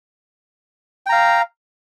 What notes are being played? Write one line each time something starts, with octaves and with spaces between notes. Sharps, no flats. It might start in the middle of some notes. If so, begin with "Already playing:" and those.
F5 G5 A#5